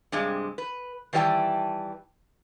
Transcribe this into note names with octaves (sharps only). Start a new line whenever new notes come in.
G2 C3 G#3
B4
D#3 E3 G3 C5 G5 A5